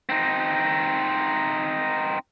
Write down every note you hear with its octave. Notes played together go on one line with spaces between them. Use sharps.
C4 D#4